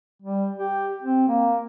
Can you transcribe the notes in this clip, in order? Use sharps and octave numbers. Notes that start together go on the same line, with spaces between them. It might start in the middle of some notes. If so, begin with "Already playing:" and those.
G3
G4
C4
A#3